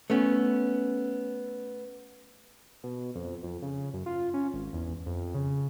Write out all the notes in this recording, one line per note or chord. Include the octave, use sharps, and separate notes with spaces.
A3 B3 C#4
B2
F2
F2
C#3
F#2
F4
C#4
G#1
E2
F2
C#3